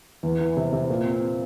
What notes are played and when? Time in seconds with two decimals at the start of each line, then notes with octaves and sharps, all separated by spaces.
0.23 E2
0.40 E3
0.57 C3
0.72 C3
0.90 A#2
1.05 C4